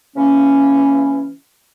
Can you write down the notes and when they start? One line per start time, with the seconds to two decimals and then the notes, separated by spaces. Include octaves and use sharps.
0.16 C#3 E3 A#3 C#4